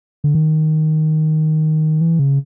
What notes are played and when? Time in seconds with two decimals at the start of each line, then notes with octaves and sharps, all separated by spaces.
0.24 D3
0.35 D#3
2.01 E3
2.19 C#3